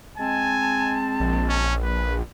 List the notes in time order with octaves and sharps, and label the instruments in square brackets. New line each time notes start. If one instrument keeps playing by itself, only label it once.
[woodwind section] G#3 C4 A5 [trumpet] G#5
[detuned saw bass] A#1
[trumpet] C#4
B4